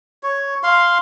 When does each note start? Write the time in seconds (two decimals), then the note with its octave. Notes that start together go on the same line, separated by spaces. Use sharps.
0.23 C#5
0.63 F5 C6